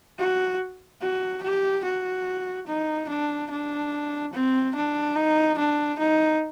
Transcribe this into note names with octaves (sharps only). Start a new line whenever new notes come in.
F#4
F#4
G4
F#4
D#4
D4
D4
C4
D4
D#4
D4
D#4